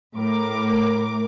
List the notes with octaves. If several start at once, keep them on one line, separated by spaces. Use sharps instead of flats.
A2 A#4 D6